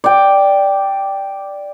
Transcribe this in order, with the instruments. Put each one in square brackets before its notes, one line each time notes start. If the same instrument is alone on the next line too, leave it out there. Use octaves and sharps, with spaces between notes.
[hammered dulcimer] D5 G5